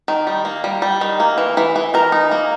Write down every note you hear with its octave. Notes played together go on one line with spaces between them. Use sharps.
D#3
G3
A#3
G3
G3
D#3
A#3
E3
E3
E3
E3 A#4
D#4
A#3